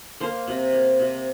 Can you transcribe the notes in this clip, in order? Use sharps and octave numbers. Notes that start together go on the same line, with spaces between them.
A#3 C5
C3
A#3
C3